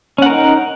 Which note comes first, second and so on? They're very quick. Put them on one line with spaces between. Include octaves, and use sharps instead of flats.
C#4 F#5 A#4 D#4